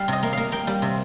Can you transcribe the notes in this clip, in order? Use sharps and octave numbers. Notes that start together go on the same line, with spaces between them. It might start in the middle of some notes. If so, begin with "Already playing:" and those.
Already playing: G3 F5
C3 D#5
A#3
A#3 F5
A#3 G5
G3
C3